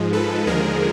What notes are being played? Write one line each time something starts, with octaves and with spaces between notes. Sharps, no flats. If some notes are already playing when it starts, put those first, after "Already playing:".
Already playing: G#2 F3 G#3
A4 B4
D#2 D3 F3 G#3 G#4 A#4